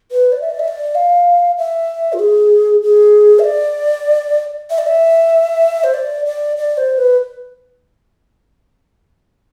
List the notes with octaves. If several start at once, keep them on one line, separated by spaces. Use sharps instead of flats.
B4
D5
E5
D5
E5
D5
F5
E5
F4
G#4
G#4
E5
D5
E5
D5
E5
C5
D5
D5
D5
C5
B4